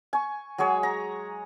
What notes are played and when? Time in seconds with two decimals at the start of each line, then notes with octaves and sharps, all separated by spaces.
0.13 G#5 C#6
0.58 F#3 G#3 G#4 C#5
0.83 A#5